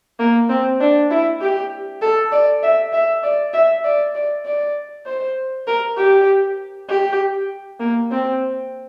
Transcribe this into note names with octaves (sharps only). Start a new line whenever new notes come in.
A#3
C4
D4
E4
G4
A4
D5
E5
E5
D5
E5
D5
D5
D5
C5
A#4
G4
G4
A#3
C4